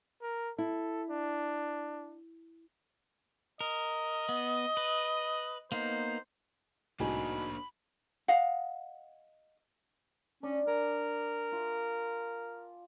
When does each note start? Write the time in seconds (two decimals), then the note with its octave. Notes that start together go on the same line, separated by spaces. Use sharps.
0.22 A#4
0.58 E4 A4
1.10 D4
3.61 A#4 D#5
4.29 B3
4.77 B4
5.72 A#3 B3 D#4 C5
7.00 C2 A2 A#3 D4 D#4 F#4 G#5 B5
8.28 D#5 F5 F#5
10.43 C#4 D4
10.67 A#4 G#5
11.52 F4